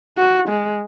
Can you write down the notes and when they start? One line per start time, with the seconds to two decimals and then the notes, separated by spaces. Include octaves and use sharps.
0.18 F#4
0.49 G#3